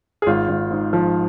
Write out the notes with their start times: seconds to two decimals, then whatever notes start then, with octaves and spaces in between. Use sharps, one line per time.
0.22 G#4
0.26 G#1 F4
0.48 G#1
0.71 G#2
0.93 F3